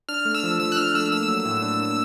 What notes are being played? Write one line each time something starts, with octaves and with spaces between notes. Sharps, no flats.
D4 F6
A3
E6
F3
F3 E6
F#6
D4 F6
A3 E6
A#3 E6
F#3
A2
D4
A#3